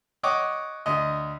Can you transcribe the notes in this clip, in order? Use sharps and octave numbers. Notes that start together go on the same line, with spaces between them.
C#5 D#5 F#5 D6
D2 D#5